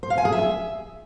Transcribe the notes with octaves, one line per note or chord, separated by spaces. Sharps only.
C5
F5
G#5
G#4
E5